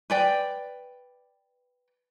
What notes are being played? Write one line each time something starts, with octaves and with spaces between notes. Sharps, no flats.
B4 D5 G5